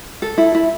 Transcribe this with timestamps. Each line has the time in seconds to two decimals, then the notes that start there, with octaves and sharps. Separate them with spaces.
0.22 A4
0.38 E4
0.55 E4